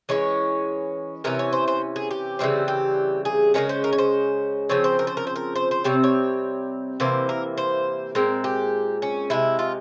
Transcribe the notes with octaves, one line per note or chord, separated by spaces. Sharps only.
E3 G#3 C#4 C#5
C3 E3 C#4 A#4
C#5
C5
C5
G#4
G4
C#3 E3 G3 C4
G4
G#4
C#3 E3 G#3 C#4 A#4
C5
A#4
C#5
C5
C#3 F3 C4 C#5
C5
A#4
C5
A#4
C5
A#4
C5
C5
C3 G3 C4 C#5
C#5
C3 E3 A#3 C5
A#4
C5
A#2 G#3 C4 A#4
G4
C#4
C3 E3 G#3 E4
F4